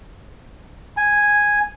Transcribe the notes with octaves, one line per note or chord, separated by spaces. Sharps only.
G#5